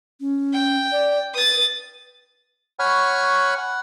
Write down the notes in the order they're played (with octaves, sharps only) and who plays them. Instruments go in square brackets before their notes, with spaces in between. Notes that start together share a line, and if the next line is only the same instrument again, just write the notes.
[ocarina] C#4
[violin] G5
[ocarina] D5
[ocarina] B4 [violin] D#6 A6
[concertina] C#5 F#5 G#5 B5 C#6 F6
F#5